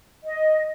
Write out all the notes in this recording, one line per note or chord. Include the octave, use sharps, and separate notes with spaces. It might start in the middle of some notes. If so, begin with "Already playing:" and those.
D#5